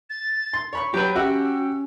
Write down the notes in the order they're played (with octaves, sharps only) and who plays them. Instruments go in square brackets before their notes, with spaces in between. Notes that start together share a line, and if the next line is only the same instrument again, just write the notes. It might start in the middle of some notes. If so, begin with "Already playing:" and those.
[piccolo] A6
[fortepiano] C6
C#5 B5 C#6
[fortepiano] F#3 [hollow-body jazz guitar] G4 B4 [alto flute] C#5 [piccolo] G6
[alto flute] C#4 [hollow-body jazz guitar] F#4 [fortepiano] G4 E5 F#5 [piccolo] E6